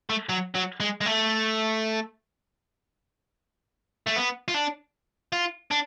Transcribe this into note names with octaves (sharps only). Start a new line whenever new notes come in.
A3
F#3
F#3
G#3
G#3
A3
A3
B3
F4
D4
F4
D4